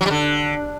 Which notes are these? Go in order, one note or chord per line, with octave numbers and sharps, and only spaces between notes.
F#3
G3
D3